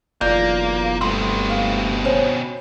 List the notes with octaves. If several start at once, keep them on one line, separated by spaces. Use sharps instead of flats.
F#1 B1 E2 A#3 F4 D5 G6
G2 B2 A3 C4 C6
F5
C#4 C5 C#5